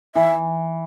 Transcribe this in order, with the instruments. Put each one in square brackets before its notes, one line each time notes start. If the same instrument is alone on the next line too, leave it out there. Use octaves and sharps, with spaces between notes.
[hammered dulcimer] E3 [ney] E5